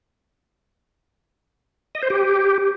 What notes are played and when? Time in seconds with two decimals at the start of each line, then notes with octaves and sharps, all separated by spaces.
1.95 D#5
2.03 C5
2.10 G4